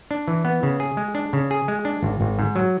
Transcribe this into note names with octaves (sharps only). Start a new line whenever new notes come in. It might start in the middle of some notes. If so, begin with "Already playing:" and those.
D4
E3
B3
C#3
G#4
G#3
D4
C#3
G#4
G#3
D4
G#1
G#1
G#2
F#3